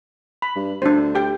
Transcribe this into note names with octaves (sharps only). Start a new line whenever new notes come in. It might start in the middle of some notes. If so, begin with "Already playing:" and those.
B5
G2
D2 D4 C5
G4 G5